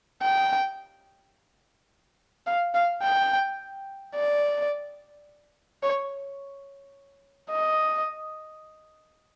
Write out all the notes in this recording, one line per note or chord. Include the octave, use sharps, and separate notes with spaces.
G5
F5
F5
G5
D5
C#5
D#5